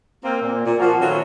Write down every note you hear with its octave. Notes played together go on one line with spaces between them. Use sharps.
A#3 C4
A#2
A#2
F3 A#3 F4 F#4
D#3 F#3 A3 B3 C#4 F4